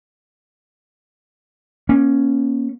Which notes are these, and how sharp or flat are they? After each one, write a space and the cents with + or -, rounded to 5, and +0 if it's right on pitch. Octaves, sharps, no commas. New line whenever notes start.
A#3 +35 C#4 +0